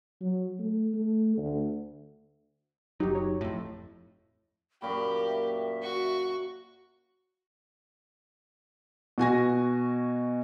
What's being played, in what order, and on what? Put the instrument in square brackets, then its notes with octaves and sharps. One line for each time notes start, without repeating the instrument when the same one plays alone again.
[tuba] F#3
A3
A3
D2
[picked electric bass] F#1 F#3 [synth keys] D#4 G4
[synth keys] C#5
[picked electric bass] F2 A2
[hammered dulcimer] F#2 A#2 [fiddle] G4 [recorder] B5
[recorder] E5
[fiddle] F#4 C#6
[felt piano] B2 F#4 G#5 A#6